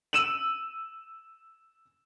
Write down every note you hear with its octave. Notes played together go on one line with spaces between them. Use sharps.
E6 D#7 E7 F#7